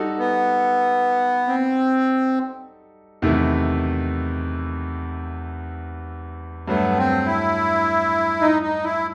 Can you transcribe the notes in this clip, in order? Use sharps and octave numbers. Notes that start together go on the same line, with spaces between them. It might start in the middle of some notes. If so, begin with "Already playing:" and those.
Already playing: G3 D#4 F#4 A4
B3
C4
E2 C3 D#3 A3 E4
G2 F#3 A3 B3
C4
E4
D#4
D#4
E4